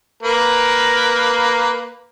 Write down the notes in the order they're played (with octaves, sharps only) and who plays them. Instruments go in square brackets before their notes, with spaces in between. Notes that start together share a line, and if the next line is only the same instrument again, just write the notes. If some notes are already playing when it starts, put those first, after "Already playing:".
[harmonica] A#3 A#4 B4